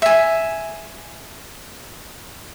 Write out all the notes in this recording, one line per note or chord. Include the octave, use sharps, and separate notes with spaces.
E5 G#5